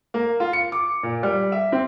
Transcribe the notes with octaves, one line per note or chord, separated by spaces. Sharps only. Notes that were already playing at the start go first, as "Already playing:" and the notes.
A#3
F4
C#7
D6
A#2
G3
E5
C4